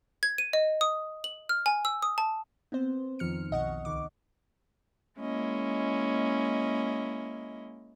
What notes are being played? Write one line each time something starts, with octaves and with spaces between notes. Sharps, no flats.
G#6
D#7
D#5
D#6
F#7
F6
G#5
E6
D#6
A5
B3 C4 C5
F2 D#3 F3 F6 C#7
B1 D#5 F#5 C#6
C#2 D#3 D6
G#3 A#3 C#4 E4 D#5